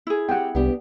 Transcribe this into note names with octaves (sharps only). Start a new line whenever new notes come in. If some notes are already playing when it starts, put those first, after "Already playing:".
E4 G#4
C4 G4 F#5 G5
C2 B3 D4 G4